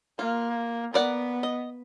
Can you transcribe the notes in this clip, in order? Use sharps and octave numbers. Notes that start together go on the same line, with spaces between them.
A#3 F4
B3 A#4 D5 F#5
D#5